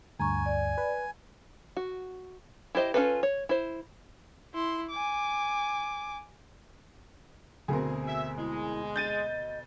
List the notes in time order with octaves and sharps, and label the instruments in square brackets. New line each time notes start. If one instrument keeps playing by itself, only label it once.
[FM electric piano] D2 G2 [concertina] G#5 [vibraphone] A#5 C#6
[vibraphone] D5
[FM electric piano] B4
[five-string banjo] F#4
E4 G4 C5 D#5
C#4 E4 F4 A4 B4
C#5
E4 C5
[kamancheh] E4 C6
G#5 D6
[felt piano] D2 B2 C4 [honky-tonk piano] G#4 A#4
[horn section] E5
[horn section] G#3 [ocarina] E4
[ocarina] D#5 [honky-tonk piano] G6 A6 D#7